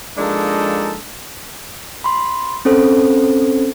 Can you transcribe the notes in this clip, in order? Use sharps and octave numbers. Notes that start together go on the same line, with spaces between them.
F3 G#3 A#3 D4 D#4 A4
B5 C6
C4 C#4 A4 C5